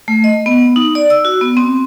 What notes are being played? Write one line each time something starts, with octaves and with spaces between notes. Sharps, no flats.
A3
D#5
B3
D#4
D5
E6
F#4
B3
C4